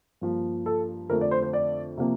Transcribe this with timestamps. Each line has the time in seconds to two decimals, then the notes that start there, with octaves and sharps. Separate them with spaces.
0.21 G2 F3 A#3
0.66 A4
1.10 F2 D3 A3 A#4
1.21 D5
1.31 C5
1.43 C5
1.53 D5
1.98 C3 F3 A#3